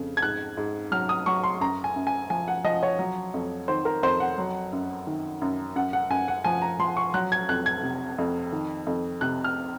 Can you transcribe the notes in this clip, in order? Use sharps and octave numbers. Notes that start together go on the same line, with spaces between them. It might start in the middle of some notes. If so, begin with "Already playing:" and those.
Already playing: F2 C#3
G#6
G#2 F#6
G#2
F#3 F6
D#6
F#3 C#6
C6
F#2 A#5
G#5
F#2
G#5
F3 G#5
F#5
F3 D#5
C#5
F#3
F2
D#3 C5
A#4
F2 C5
F#5
F#3
F#2
D#3
F#2
F#2 F#5
F#5
F#2 G#5
F#5
F3 G#5
A#5
F3 C6
C#6
F#3 F#6
G#6
F2 F#6
G#6
C3
F2
D#3
F2
C3 F#6
F6